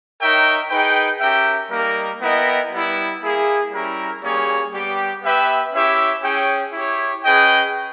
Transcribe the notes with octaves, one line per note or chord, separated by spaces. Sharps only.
D#4 A#4 C#5 E5 G5
D#4 G#4 B4 G5
C#4 G4 A#4 E5 G5
G3 A#3 D#4 A#4
B3 E4 A#4 D#5 G5
G3 B3 E4
A#3 E4 G#4
G3 C#4 E4 A#4
G3 A#3 C#4 G#4 C#5
G3 B3 G4
B3 G4 B4 E5 G5
C#4 E4 G4 C#5 E5
C#4 G#4 C#5 G5
E4 G4 C#5
C#4 G#4 B4 D#5 G5